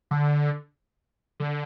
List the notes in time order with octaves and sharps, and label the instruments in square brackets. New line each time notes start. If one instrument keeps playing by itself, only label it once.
[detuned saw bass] D3
D3